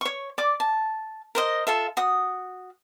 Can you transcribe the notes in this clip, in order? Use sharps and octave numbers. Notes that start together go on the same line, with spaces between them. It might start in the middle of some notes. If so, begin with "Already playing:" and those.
C#5 C#6
D5 D6
A5
A#4 C5 D#5
F4 A4 E5
F#4 D#6